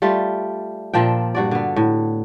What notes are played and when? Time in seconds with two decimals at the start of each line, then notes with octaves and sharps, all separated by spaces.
0.02 G3 A3 F4
0.94 A#2 F3 D4 G5
1.35 G2 F#4 D5
1.51 D3 B3
1.76 A2